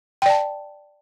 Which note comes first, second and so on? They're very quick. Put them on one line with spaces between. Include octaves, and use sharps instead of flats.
G5 D5 A5